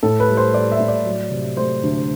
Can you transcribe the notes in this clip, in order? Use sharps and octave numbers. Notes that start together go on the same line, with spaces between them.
A2 A4
B4
G3
C5
G3 D5
E5
A2
D5
F#3
C3
A3 C5
D2